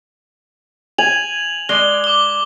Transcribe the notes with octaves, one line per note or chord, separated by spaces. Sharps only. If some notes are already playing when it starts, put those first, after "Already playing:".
G#5 F7 F#7
G#3 D5 G7
D6 G7